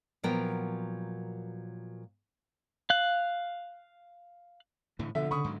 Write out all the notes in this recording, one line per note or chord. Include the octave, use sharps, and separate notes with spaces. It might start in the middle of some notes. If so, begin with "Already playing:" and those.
A#2 F3 F#3 B3 A#4 G5
F5 F#6
A2 D3 E3
B2 D3 F3 E5
C#3 B5 C#6 D#6
G#2 D3 F#3